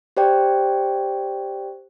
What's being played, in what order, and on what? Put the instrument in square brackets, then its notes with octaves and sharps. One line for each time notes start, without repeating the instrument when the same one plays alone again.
[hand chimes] G4 C5 D5 G5